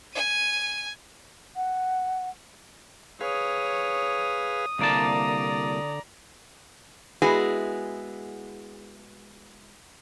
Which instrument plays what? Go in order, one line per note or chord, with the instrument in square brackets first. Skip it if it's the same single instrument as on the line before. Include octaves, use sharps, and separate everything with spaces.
[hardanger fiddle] G#5 [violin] D#7
[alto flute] F#5
[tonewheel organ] G#4 B4 F5 [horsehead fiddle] C#5 [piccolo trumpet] D#6
[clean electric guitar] C2 A#3 A5 [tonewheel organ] D3 [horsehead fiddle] D5 A#5
[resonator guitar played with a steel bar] G#3 B3 E4 F#4 G#4